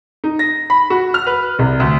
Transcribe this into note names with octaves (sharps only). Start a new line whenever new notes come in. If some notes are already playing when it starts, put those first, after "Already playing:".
D#4
A#6
B5
F#4
F6
B4
C2
D2